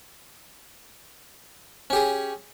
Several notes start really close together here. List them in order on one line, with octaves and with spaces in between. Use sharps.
C#4 G4 G#4